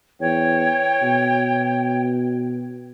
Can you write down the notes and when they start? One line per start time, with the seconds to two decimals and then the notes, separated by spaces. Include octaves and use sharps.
0.20 E2 C#5 G5
1.02 B2